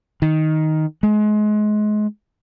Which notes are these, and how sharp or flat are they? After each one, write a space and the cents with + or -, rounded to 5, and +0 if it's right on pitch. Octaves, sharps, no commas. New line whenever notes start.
D#3 +5
G#3 +30